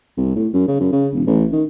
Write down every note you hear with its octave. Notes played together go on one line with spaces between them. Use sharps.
C2
A2
F#2
C#3
F#2
C#3
E1
A1
D#3